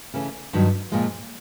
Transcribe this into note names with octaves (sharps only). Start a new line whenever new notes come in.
C#3 E3 A3 C#4
G2 D#3 F#3
A#2 F3 G#3